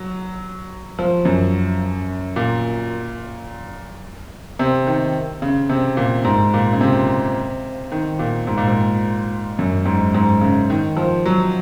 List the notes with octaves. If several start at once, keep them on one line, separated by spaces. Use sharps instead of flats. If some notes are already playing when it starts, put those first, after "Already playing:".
Already playing: F#3
F3
F#2
A#2
C3
D#3
C#3
C3
A#2
G#2
A#2
C#3
C3
D#3
A#2
G#2
A#2
G#2
F#2
G#2
G#2
C#3
D#3
F3
F#3